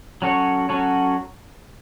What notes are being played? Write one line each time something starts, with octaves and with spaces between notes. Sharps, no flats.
F#3 C#4 F#4 A4 C#5
F#3 C#4 F#4 A4 C#5